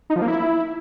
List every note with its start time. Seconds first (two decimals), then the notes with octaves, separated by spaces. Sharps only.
0.10 D#4
0.16 F3
0.22 A#3
0.28 E4